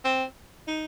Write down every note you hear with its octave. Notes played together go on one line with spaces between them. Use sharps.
C4
D#4